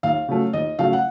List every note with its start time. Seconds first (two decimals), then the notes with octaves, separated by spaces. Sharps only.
0.03 D#2 F5
0.28 C#3 F#3 A3
0.53 D#2 D#5
0.79 C#3 F#3 A3 F5
0.93 F#5